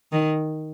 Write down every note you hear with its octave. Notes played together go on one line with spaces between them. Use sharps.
D#3